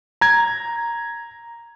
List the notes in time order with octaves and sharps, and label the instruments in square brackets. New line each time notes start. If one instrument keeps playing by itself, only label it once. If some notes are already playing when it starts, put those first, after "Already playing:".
[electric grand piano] A#5 G#6